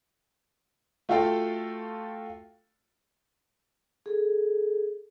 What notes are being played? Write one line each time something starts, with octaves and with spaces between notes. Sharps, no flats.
A3 F4 F#4 A4 F5 G5
G#4 A4